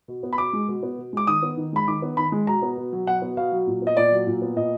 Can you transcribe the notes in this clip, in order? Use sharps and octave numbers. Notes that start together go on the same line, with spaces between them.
B2
B3
B5
B2 D6
G#3
B2
B3
B2
G#3 D6
D#3 D#6
B3
D#3
G#3 B5
D#3 D6
B3
D#3 B5
G#3
B2 A#5
B3
B2
F#3
B2 F#5
B3
B2 F5
F#3
A#2
B3 D#5
A#2 D5
F#3
A#2
B3
A#2 D#5